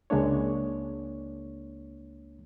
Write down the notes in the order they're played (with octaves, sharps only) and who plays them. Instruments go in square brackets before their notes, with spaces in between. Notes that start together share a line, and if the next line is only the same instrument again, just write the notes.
[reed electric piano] C#2 G#3 A#3 D4 C#5